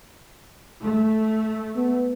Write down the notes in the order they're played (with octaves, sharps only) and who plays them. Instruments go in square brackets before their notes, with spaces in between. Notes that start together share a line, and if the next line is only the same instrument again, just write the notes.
[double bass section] A3
[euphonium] B3